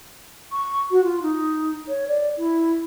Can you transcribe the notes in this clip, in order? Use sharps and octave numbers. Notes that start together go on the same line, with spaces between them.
C#6
F#4
F4
D#4
C#5
D5
E4